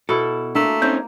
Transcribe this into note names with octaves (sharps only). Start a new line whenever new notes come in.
B2 E4 A4
A3 A#3 D4
C4 C#4 D#4 G6